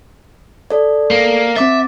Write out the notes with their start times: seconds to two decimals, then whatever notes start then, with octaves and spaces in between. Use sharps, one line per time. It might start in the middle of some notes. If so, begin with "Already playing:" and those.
0.70 A4 D5
1.11 A#3
1.56 C4 E5 D6 A6